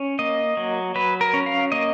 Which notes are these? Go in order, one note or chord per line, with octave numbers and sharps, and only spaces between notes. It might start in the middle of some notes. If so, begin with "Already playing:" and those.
Already playing: C#4
A#3 D#5
F#3
F#3 B4
A#4
C#4
F5
A#3 D#5